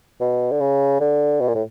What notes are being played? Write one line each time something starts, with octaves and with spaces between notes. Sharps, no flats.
B2
D3
C#3
D3
B2
A#2
A2